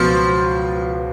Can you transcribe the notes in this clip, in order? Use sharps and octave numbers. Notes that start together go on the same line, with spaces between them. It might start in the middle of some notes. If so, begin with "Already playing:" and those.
Already playing: C#2 B2 F3 F#3 B3 F#4